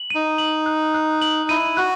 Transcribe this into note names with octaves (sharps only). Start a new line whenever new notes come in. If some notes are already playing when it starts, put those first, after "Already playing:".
Already playing: F#7
D#4 D#7
F#7
F#6
F#6
F#7
E4 D#7
F#4 F#6